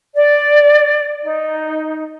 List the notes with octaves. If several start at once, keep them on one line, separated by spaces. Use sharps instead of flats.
D5
D#4